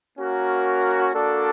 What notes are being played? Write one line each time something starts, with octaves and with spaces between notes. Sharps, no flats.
A#3 C#4 F#4 A#4
A#3 D4 F#4 A4 D5